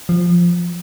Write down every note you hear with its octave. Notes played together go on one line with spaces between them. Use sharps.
F3